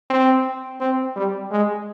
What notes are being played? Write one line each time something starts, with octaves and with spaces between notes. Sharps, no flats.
C4
C4
G3
G#3